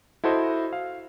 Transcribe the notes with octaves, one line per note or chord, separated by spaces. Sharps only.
E4 F#4 A4 C5 D#5
F5